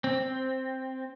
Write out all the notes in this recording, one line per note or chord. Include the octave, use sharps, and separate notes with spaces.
C4